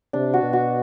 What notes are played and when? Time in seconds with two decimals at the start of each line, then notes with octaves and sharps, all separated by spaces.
0.13 C3 D4
0.34 F#4
0.43 B2
0.53 F#4